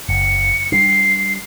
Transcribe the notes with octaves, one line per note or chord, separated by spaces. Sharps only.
F#1 C#7
G3 D4 C7